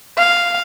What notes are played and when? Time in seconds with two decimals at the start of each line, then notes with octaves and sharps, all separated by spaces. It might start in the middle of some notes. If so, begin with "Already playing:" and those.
0.18 F5